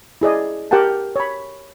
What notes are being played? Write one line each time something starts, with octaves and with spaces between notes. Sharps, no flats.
E4 G#4 D5 D#5
G4 A#4 F#5 G5 A5
C#5 B5